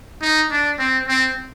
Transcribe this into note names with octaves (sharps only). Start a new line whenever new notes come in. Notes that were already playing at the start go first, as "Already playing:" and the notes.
D#4
D4
C4
C4